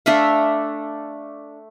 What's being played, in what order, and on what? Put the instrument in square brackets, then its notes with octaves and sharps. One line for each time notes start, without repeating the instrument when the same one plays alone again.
[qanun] A3 D4 E5 F5